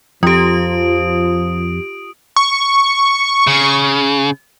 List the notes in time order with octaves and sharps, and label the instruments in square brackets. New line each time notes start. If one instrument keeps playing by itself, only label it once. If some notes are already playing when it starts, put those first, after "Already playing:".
[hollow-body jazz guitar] F2 [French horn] F3 [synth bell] F4 G4 [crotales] D#6 D7
[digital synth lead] C#6
[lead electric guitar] C#3